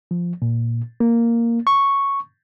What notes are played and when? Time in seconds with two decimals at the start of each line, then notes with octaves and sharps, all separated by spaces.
0.11 F3
0.42 A#2
1.00 A#3
1.67 C#6